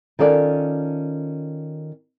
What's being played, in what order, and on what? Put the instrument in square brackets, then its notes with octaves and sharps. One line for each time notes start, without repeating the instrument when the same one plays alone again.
[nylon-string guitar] D#3 C#4 F4 A4 D5